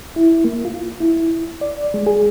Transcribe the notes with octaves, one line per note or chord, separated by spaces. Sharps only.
E4
A#3
F4
E4
D5
G#3
G#4